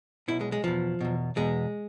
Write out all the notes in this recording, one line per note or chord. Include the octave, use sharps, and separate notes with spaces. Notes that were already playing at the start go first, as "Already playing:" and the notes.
B1 B2 E4
G#3
G#3
E2 B2 F3
E2 B2
E2 B2 G#3